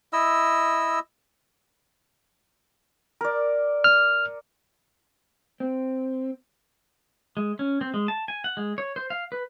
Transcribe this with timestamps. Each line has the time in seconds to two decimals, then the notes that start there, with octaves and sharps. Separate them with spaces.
0.13 E4 D#5 E6
3.21 A#4 D5
3.84 F6
5.60 C4
7.37 G#3
7.59 C#4
7.81 C4
7.94 G#3
8.08 A5
8.28 G#5
8.44 F#5
8.57 G#3
8.78 C#5
8.96 C5
9.10 F5
9.32 B4